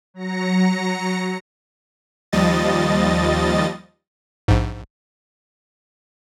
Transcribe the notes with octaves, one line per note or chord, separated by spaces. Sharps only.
F#3 A#5 A#6 C#7
D#2 F3 G3 D#5 A6
A#1 G#2